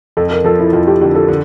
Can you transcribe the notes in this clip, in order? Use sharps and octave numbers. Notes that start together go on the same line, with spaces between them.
F2 A4
A#4
F3 A4
E4
F2 F4
G4
D3 G4
A4
D3